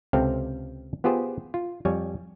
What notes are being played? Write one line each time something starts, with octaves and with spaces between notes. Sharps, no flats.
C#2 C3 C4 A4 F5 G5
B3 F4 G4 G#4 C5
F4
F2 G3 C#5 G#5